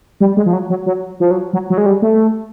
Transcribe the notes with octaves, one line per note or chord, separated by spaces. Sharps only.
G3
G#3
F3
F#3
F#3
F#3
F3
F#3
F#3
F#3
G#3
G3
A3